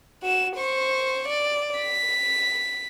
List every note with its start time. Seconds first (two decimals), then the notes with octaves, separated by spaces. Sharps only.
0.23 F#4 E7
0.56 C5 C#6
1.28 D5
1.79 B6